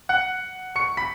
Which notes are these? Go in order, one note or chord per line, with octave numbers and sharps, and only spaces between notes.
F#5 F#6
C#6 C#7
B5 B6